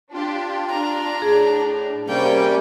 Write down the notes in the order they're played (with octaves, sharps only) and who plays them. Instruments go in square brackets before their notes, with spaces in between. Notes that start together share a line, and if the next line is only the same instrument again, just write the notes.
[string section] D4 G4 [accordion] F4
[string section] D4 [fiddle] A#5
[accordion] A2 [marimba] G#4
[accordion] C3 G3 A#3 [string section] C#4 [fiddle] G5